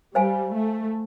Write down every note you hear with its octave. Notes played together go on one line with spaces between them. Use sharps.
G3 C5 F5 G#5
A3